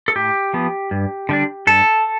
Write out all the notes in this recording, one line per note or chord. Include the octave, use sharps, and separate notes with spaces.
A4
A2 G4
F3 B3
G2
D3 G3 D4
G2 A4